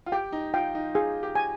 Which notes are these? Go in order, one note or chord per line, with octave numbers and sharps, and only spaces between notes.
F4
G4 G5
D#4
F4 G5
D#4
F4 G#4
G4
G#5